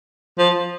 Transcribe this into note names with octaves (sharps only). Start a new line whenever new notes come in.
F3